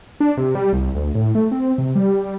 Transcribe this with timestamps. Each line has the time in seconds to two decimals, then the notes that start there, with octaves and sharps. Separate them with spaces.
0.20 D4
0.37 C3
0.55 G3
0.73 C2
0.95 D2
1.15 A2
1.35 A3
1.51 C4
1.78 C3
1.95 G3